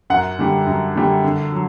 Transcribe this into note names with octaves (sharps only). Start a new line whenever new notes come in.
F#2 F#5
D3 G3
F#2
D3 G3
D3
F#3